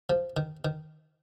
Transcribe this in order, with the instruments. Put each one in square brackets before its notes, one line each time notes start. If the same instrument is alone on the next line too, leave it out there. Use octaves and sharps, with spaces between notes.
[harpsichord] F3
D#3
D#3